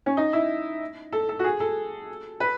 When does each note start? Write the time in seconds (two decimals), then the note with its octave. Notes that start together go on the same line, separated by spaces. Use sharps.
0.06 C#4
0.17 D#4
0.33 E4
1.12 A4
1.29 A4
1.39 F#4
1.44 G#4
1.60 A4
2.40 B4